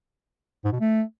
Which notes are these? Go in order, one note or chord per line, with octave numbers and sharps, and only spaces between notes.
G#2
B2
A3